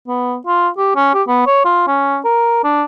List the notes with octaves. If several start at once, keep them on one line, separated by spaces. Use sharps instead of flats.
B3
F4
G4
C#4
G4
B3
C#5
F4
C#4
A#4
D4